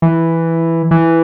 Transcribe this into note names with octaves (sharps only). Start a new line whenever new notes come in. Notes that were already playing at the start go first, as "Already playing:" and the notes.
E3
E3